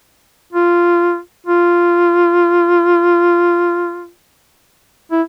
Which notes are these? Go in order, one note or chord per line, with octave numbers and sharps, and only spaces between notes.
F4
F4
E4